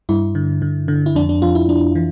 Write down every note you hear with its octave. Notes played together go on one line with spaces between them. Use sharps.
G2 E4
D3
D3
D3
E4
F2 D4
D4
F2 F4
E4
F2 D4
E3